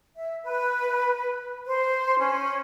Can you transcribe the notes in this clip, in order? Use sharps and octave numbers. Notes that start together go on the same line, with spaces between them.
E5
B4
C5
C#4